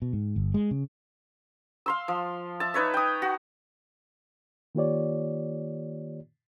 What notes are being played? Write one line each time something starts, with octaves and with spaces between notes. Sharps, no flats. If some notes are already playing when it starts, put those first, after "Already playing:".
B2
G#2
G1
G#3
C#3
F5 C6 E6
F3
E5 A5
D#4 B4 C#5 E5
G5 D#6
F#4
D#3 A#3 F4 G4 C#5 D5